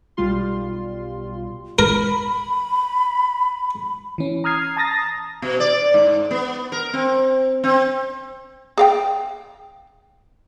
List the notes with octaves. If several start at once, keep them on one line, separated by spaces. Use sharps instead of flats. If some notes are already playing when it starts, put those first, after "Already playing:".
B1 B2 G3 F4 C6
A#4 B5
E3 C#4
A#5 D#6 F6 G#6 C7
A5 A#5 D#6 A6 A#6
B2
D5
G#2
B3
A#4
C4
C4
G#4 F5 G5